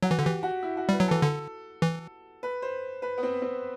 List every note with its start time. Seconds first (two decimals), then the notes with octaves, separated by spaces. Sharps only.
0.03 F#3 F#4
0.11 E3
0.19 D3
0.23 E3 G4
0.43 F#4
0.62 E4
0.77 F#4
0.89 G3 B4
1.00 F#3
1.08 E3 A4
1.22 D3 A4
1.82 E3
2.43 B4
2.62 C5
3.02 B4
3.18 B3
3.23 C4
3.42 C4